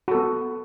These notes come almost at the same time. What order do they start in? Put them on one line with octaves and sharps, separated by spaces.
F#4 A4 B3